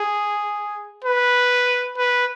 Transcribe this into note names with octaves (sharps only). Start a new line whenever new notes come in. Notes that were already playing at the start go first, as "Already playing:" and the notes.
Already playing: G#4
B4
B4